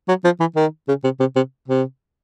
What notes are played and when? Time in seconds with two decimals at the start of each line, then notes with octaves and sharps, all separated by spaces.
0.08 F#3
0.25 F3
0.40 E3
0.56 D#3
0.88 C#3
1.04 C3
1.20 C3
1.36 C3
1.68 C3